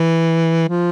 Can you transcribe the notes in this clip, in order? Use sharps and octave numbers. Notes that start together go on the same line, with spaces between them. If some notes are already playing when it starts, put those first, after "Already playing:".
Already playing: E3
F3